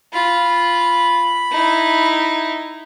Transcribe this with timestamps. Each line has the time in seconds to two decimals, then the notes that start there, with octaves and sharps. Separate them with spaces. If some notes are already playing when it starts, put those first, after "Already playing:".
0.13 F4 B5
1.51 D#4 E4